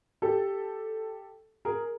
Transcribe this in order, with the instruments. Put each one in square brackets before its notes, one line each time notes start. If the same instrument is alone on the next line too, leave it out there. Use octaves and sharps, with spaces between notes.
[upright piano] G4 A4
G#4 A#4